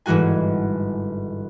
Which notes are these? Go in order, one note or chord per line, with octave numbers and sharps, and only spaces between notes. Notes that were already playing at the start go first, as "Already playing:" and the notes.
G1 G#2 E3 G#3 F#4 G#5